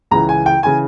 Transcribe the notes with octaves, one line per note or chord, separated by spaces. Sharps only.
C#2 C#3 E3 A#5
G#5
G5
C#3 E3 G#5